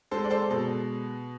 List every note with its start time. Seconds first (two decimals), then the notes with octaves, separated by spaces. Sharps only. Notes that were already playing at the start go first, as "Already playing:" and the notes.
0.11 G#3 A4 C5
0.24 D5
0.30 A4 C5
0.50 B2 A4